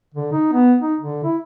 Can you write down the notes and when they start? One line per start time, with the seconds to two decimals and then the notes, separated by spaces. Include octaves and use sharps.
0.14 D3
0.32 D#4
0.53 B3
0.82 D#4
1.01 D3
1.24 E4